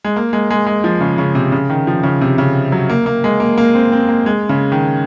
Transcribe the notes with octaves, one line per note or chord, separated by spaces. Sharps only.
G#3
A#3
G#3
G#3
G#3
F3
C#3
C#3
C3
C#3
D#3
F3
C#3
C3
C#3
F#3
A#3
A#3
G#3
A#3
A#3
C4
C4
A#3
G#3
C#3
D#3